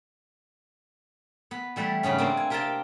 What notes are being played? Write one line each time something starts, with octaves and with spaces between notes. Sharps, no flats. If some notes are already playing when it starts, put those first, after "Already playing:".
B3
E3 G3 A3 E4
G#2 C#3 B3 C#4
A#3 C4 D4 A4
G#5
C3 G4 A#4 F5 G5 A5